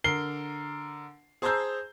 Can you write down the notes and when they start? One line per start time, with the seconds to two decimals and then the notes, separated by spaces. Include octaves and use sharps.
0.04 D3 A#4 C7 G7
1.42 G#4 C5 A5 A#5 E6 G6